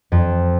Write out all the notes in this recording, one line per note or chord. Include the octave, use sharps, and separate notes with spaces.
F2